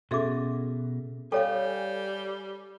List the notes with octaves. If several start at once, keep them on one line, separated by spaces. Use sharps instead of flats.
B2 C#4 F#4 G#4 A4 E5 D6
G3 A4 C#5 F5 G5 G#5